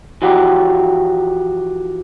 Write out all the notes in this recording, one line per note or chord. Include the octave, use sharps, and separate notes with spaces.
E3 F3 F#4 G4